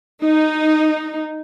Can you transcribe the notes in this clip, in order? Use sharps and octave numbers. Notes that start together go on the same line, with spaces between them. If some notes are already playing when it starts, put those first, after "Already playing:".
D#4